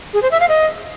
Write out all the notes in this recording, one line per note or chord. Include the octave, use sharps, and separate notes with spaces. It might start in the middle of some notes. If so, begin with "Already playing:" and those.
G#4
C5
E5
F5
D#5